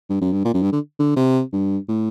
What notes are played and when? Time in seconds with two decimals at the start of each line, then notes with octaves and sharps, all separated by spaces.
0.10 G2
0.21 F#2
0.33 G2
0.45 A#2
0.54 F#2
0.63 G2
0.73 D3
0.99 D3
1.16 C3
1.53 G2
1.89 A2